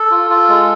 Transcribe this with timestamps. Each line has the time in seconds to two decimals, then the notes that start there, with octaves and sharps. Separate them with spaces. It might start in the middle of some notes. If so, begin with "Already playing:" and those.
Already playing: A4
0.11 F4
0.30 F4
0.49 G#3